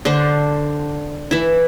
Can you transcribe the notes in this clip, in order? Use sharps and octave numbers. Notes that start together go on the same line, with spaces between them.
D3 D4 C5
E3 E4